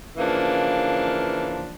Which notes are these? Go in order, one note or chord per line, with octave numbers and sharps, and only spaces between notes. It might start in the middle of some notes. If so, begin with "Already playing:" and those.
C#3 E3 F3 A#3 D4